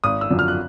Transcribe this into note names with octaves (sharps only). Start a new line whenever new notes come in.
G#1 D#6
E6
F#2 D3 F3
F6
F#6